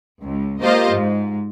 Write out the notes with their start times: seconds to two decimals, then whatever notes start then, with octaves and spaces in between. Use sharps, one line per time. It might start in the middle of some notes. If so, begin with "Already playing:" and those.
0.21 C#2
0.61 A#3 F4 G4 C5 D#5 F5
0.92 G#2